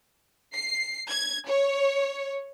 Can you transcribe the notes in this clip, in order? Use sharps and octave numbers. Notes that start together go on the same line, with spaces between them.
C7
G#6
C#5